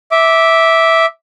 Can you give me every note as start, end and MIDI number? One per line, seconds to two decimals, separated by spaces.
0.11 1.06 76
0.11 1.06 86